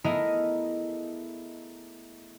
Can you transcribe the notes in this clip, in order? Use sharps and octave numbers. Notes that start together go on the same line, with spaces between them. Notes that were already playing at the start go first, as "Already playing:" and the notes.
A3 B3 E4 G#4 A#4 D#5